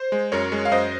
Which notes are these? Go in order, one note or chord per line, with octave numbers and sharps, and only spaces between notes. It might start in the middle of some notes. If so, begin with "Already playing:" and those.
Already playing: C5
G#3
F#2 A#4 C#5
G#3
F5
F#2 C5 D#5